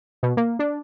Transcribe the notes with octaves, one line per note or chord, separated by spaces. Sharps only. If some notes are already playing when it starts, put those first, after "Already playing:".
B2
A#3
D4